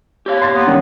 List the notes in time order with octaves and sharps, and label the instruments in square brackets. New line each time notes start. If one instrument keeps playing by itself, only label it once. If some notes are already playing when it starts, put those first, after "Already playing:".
[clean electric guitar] G4 C#5 F5
[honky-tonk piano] C6 A6 A#6
[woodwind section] A#3 B3
[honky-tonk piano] D#3 G3 C#4